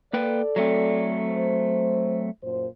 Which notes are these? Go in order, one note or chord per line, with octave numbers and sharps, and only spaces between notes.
A#3 A4 B4 D5 G5
F#3 A3 C4
C5
F#2 A#2 C5